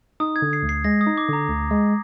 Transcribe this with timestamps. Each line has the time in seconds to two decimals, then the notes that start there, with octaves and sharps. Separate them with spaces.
0.20 D#4 D#6
0.36 G#6
0.42 D3
0.53 C7
0.63 D2
0.69 C7
0.84 G#3 A#6
1.01 D#6
1.07 D#4
1.17 D6
1.29 D3 A#5
1.49 D2
1.71 G#3